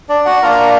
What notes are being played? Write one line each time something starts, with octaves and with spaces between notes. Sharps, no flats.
D4 D5
F#4 F#5
A#3 D4 F4 A#4 A#5